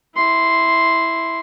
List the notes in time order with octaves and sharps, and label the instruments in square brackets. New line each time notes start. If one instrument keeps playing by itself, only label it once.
[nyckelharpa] E4 C6